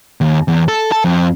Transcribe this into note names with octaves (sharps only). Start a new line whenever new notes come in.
D#2
E2
A4
A4
F2